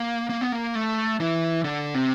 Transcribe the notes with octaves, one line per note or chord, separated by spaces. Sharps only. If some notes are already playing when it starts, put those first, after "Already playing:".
Already playing: A#3
A#3
B3
A#3
A3
E3
D3
C3